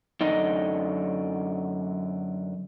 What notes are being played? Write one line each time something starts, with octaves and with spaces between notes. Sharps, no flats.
F#2 D3 D#4 D#5